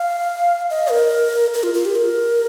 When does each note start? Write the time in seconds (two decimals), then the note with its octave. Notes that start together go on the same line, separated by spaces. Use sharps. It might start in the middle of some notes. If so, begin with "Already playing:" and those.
Already playing: F5
0.70 D#5
0.91 A#4
1.54 A#4
1.63 F4
1.74 F4
1.85 G4
1.95 A#4